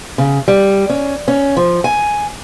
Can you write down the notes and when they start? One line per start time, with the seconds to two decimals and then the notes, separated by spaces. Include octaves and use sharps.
0.18 C#3
0.48 G3
0.90 C#4
1.28 C#4
1.57 F3
1.84 G#5